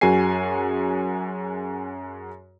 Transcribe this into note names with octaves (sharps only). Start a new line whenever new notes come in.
F#2 F#4 G#4 G#5 C7